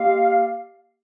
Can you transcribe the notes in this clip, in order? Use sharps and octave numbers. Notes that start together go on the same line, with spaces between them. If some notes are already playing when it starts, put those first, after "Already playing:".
Already playing: A#3 G4 D#5 F5